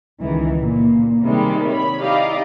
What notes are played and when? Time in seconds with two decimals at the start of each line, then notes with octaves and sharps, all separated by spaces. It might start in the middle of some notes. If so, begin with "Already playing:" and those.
0.21 C#2 D#3 E3
0.62 A#2
1.22 C3 D#3 G3 G#3
1.68 C#5 B5
2.00 D#4 E4 G4 D5 D#5 F5